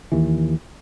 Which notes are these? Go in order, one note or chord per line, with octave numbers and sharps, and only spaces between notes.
D#2 E3